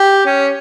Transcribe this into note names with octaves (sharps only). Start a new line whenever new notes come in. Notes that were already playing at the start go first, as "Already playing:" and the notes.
Already playing: G4
C#4